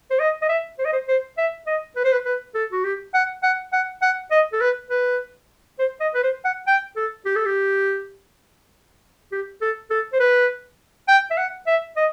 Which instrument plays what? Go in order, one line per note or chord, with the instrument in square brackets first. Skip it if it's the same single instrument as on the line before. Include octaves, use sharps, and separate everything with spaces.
[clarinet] C5
D#5
D#5
E5
C5
D#5
C5
C5
E5
D#5
B4
C5
B4
B4
A4
F#4
G4
F#5
F#5
F#5
F#5
D#5
A4
B4
B4
C5
D#5
B4
C5
F#5
G5
A4
G4
A4
G4
G4
A4
A4
C5
B4
G5
E5
F#5
E5
D#5